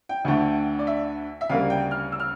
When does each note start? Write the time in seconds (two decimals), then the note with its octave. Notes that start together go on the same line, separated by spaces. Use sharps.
0.09 G5
0.25 D2 D3 A3
0.79 D5
0.87 E5
1.41 E5
1.49 D2 C#3 G3 A#3 F5
1.70 G5
1.91 F6
2.12 E6
2.20 F6